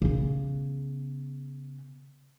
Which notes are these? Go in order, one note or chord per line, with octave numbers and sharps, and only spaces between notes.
C#3 B3